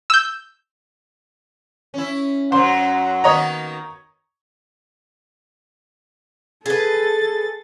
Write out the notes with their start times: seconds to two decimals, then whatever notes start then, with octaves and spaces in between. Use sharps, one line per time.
0.10 E6 G6
1.94 C#4 E4
2.52 F#2 F#3 C5 F#5
3.24 D#3 A#3 B3 C#5 D#5 A#5
6.66 G#4 A4 B4 A6